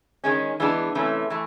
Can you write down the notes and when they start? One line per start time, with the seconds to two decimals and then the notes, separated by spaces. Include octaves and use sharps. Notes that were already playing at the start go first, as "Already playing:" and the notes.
0.24 D#3 G#3 C#4
0.60 E3 G#3 B3 D4
0.95 C3 E3 A3 C#4
1.30 E3 A3